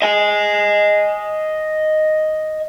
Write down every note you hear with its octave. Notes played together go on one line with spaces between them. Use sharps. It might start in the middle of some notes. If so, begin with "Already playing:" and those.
D#5 G#5